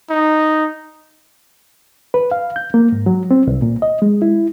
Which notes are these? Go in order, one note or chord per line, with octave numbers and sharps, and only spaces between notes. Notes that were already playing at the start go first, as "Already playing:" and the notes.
D#4
B4
F5
G6
A#3
G#2
F#3
C4
C2
A#2
D#5
G#3
E4